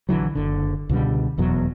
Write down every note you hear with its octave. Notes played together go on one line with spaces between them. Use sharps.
A#1 D3 E3 F#3
F#1 D3
C#2 B2 D3 G3
F1 E2 B2 F#3